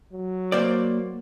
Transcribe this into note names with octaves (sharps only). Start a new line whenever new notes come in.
F#3
A#3 C5 D5